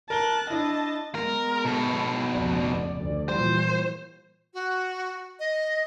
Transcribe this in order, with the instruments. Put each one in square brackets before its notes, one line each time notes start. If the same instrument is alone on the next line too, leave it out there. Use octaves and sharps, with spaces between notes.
[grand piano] A#4 G7 [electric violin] A5 F#6
[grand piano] D4 E4 [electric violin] D#5 A5
[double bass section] G#3 B3 [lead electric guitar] A#4
[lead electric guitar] B2 A4
[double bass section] F1 C#2 [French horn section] D5
[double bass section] D2
[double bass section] A#2 E3 G3 [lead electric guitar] C5
[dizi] F#4
D#5